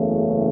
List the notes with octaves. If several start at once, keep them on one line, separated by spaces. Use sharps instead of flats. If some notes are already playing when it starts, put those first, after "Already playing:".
Already playing: F#1 E2 C#3 E3 A3